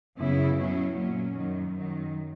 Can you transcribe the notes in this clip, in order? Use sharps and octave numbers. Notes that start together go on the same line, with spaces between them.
F#2 C#3 E3 B3 E4
B2 F#3 C#4 E4
A#2 F#3 A#3 C#4
F#2 D#3 F#3
F#2 D#3 F#3